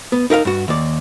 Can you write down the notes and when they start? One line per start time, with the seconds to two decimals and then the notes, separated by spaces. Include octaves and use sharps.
0.12 B3
0.30 D#4 A#4 E5 F5
0.45 G2 F#4
0.68 D#2 D5